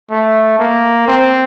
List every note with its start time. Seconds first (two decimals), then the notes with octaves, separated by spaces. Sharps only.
0.10 A3
0.59 A#3
1.08 C4